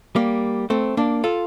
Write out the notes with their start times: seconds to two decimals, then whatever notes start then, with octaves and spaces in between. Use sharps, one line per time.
0.16 G3 A#3
0.70 A3 C4
0.97 A#3 D4
1.24 F4 A4